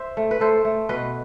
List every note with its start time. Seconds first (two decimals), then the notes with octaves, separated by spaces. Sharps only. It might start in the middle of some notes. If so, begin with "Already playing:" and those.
Already playing: C5 E5
0.17 A3
0.31 B4
0.40 A3 A4 C5
0.65 A3
0.89 B2 B4 D#5